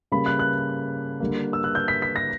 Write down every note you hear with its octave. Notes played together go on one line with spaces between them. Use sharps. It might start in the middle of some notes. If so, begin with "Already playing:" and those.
C#3 G3 A#3 B5
F#6
F#6
D3 G3 A#3
E6
F#6
G6
B6
B6
A#6